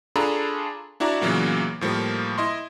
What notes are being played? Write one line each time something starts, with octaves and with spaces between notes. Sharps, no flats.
D4 F4 G#4 A4 A#5 B5
D4 E4 F#4 D5 A#5
A#2 C#3 E3 F#3 A#3 B3
A2 F3 G3 A#3
E4 D#5 C6